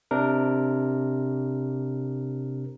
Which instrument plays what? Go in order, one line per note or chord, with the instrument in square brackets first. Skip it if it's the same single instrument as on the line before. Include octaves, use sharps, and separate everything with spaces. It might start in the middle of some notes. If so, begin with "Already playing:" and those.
[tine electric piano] C3 D4 A#4